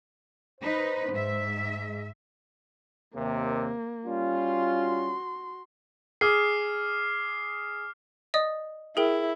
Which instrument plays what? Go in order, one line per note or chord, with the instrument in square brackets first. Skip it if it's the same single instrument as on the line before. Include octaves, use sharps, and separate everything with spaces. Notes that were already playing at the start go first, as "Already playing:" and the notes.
[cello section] D#4 B4 [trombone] C5
[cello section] G#2 E5
[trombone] G#3
[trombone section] D#2 C3 [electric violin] A#3
[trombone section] G3 C#4 F4
[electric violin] F#4 C6
[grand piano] G#4 [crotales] D6 F6 C7
[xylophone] D5 D#5 D#6
[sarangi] E4 [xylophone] G#4 A#4 G5